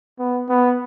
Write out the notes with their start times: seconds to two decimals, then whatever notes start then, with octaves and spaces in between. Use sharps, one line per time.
0.19 B3
0.49 B3